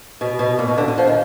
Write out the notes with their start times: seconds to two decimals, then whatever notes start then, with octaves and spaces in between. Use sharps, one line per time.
0.21 B2
0.39 B2
0.59 A#2
0.68 B2
0.78 D3
0.88 D3
0.98 F3
1.07 D#3